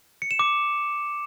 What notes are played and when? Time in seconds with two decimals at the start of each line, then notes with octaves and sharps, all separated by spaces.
0.22 C#7
0.31 E7
0.39 D6